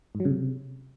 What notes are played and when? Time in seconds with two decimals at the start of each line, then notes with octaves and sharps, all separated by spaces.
0.15 G#2
0.20 F#3
0.25 C#3
0.30 C3